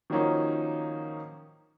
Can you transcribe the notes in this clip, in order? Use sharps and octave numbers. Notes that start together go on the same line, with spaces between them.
D#3 F3 F#3 A#3 C#4 D#4